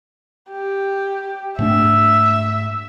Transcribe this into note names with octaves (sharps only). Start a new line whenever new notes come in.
G4
G#2 A3 D4 E5